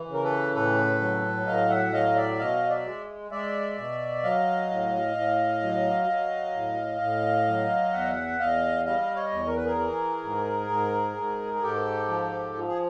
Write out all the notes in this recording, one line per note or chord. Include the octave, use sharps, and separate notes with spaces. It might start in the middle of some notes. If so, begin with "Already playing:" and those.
Already playing: E3
C#3
A#4
A4 B4
A2 A4 B4
F#3
A2 D#5 F5
E5 F#5
F#3 D#5 F5
D5 E5
B2 D#5 F5
D5 E5
G#3
G#3 D5 E5
B2
F#3 D#5 F5
A2
A2
F#3
F#3
A2
A2
F#3
E2 E5 F#5
E2 D#5 F5
G3 D#5 F5
C#5 D#5
E2
A#4
B4
G#4 A#4
E3
G#2
G#2
G#2
G#4
G#2 G4 A4
F3
F3
G#4